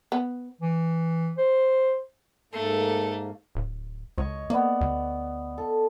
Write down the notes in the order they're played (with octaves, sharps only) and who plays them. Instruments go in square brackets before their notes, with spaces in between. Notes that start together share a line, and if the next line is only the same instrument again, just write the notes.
[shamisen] B3
[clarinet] E3
C5
[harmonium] G#2 A#3 [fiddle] A3 [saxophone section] A4
[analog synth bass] D1
[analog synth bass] C#2 [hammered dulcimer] C#5 D#5 C#6
[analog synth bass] A#3 [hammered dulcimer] B3 D5
[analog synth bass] D2
[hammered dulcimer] A4